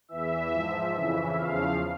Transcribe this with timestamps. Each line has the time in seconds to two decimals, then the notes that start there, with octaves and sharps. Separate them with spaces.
0.09 E2 E3 E5
0.51 G#2 F3
0.94 F2 C#3 E3
1.36 E2 C#3 F3 F5